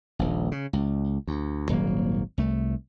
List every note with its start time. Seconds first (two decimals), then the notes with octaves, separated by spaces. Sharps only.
0.19 D#1 A#1
0.52 C#3
0.73 C#2
1.27 D2
1.69 D#1 G#1 F#3 A#3
2.38 C2 A3